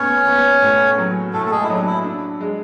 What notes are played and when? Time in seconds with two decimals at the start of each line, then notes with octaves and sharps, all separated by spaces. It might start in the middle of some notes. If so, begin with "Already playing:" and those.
Already playing: A2 B3 C#4 C#5
0.27 B3
0.62 A2
0.98 F#3
1.33 A2 A3 A4
1.46 A4
1.51 G#3 G#4
1.64 E4
1.69 F#3 D4
1.86 E4
2.05 D4
2.41 G#3